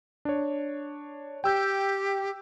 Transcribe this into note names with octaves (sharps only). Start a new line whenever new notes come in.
D4 C#5
G4 G5 E6 G6